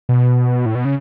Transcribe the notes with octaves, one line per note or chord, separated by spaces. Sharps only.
B2
A2
B2
C#3